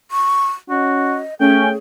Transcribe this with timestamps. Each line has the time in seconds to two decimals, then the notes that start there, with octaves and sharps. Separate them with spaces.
0.11 C#6
0.70 C#4 F#4 D#5
1.40 A3 C#4 G#4 G5